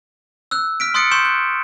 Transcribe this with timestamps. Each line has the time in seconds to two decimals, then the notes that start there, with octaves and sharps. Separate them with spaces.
0.51 E6 F#6
0.80 F6 B6 D7
0.94 C6 D#6 F#6 A6 C#7 D7
1.11 C6 C#6 G6 E7
1.25 F#6